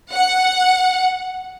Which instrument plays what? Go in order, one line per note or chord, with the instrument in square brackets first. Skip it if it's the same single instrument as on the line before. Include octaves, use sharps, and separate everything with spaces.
[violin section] F#5